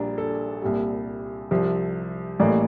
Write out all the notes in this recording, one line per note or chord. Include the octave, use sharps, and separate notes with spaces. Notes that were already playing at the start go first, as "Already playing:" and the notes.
Already playing: A#1 A#2 G3 D4 A#4
A4
C2 A#2 G3
C2 C3 F3
A1 A2 E3 G3 A#3 A#4 D5